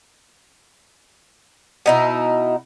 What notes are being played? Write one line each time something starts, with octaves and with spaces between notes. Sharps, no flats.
B2 D#4 E4